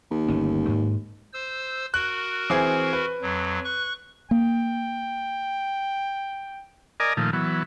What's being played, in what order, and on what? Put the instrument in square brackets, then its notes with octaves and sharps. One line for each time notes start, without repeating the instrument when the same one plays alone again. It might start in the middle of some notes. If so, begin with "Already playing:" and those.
[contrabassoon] D#2
[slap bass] G1 A3 C#4
G#2
[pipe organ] C5 E6
[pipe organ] F#4 A#4 [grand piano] F#6
[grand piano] E3 C4 G#4
B4
[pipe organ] F2 F#3
C#6 F#6
[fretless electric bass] A#3 [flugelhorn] G5
[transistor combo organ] A#4 D5 D#5 G#5 A#5
A#2 D#3 F3 A3
E3 F#3 B3